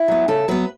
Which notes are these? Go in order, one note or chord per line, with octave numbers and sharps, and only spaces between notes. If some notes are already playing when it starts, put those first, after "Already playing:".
Already playing: E4
F#3 B3
C#3 A4
F#3 B3 B4